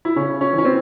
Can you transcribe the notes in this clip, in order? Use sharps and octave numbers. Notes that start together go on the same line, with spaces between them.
E4
C#3 C#4
C#4
E3
C#4
C4